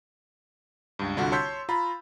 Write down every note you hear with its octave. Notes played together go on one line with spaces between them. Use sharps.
C#2 G2
C2 D3 F4 F#4
C#5 A5 C6 E6 G6 B6
F4 A#5 B5